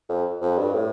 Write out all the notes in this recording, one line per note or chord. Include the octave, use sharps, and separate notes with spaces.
F2
F2
G2
A2